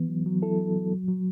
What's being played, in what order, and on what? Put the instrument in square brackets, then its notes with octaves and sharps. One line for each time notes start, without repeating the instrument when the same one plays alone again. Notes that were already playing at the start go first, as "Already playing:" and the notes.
Already playing: [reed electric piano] E3 B3
F#3
F#3
E4 A4
F#3
F#3
F#3
F#3